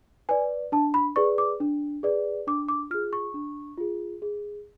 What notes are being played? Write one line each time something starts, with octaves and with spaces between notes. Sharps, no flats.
B4 D5 G#5
D4 A5
B5
G#4 B4 D5 C#6
D6
D4
G#4 B4 D5
D4 D6
D6
F4 G#4 F6
C#6
D4
F4 G#4
G#4